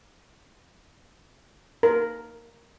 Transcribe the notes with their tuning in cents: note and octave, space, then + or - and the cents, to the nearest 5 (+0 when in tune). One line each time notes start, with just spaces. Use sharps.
A#4 +0